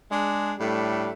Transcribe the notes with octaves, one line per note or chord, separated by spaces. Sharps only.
G#3 D4
A2 G3 A3 D4